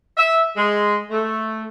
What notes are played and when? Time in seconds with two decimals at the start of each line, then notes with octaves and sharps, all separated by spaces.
0.16 E5
0.56 G#3
1.10 A3